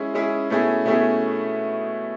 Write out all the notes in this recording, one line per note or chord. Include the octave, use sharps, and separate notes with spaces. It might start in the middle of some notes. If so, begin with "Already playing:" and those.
Already playing: G#3 C#4 E4 G#4
G#3 C#4 E4 G#4
B2 A3 C#4 E4 G#4
B2 A3 C#4 E4 G#4